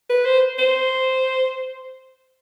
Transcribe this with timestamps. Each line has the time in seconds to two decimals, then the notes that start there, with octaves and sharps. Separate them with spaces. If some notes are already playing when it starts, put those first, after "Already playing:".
0.10 B4
0.25 C5
0.58 C5